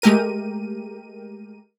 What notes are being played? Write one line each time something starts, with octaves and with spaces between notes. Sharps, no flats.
G#3 A3 G4 A#4 D#7